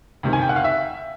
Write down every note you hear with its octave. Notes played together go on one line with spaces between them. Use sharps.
C#2 C3 D#3
G#5
G5
F#5
F5
E5